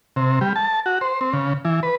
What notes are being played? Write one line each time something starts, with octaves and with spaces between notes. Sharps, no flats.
C3
G3
A5
F#4
C5
C4
C#3
E3
B4